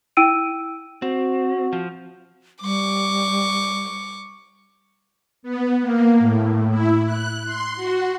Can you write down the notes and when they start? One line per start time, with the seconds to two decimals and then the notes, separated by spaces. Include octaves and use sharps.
0.17 E4 G5 E6 D7 D#7
1.02 C4 F#4
1.73 F3
2.62 G3 C#6 D6
5.43 B3
5.82 A#3
6.19 A2
6.69 E4
7.04 F#6
7.45 C6
7.76 F#4